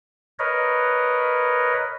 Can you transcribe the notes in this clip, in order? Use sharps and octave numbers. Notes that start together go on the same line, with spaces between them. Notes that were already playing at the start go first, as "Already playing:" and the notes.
A#4 B4 C#5 D#5